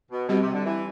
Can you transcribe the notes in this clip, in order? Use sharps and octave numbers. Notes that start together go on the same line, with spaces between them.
B2
B2 G3 C4 G4
C3
D3
E3